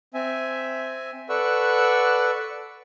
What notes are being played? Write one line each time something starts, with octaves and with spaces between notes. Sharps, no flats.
C4 E5 G#5
A4 B4 D5 F#5 C#6 E6